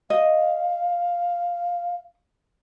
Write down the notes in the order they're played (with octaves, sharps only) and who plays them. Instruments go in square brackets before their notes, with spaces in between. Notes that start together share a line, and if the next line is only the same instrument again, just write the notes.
[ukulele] D#5 [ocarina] F5